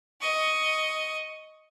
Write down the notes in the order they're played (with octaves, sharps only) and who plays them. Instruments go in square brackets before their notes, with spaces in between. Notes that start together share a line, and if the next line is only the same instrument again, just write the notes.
[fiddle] D#5 C#6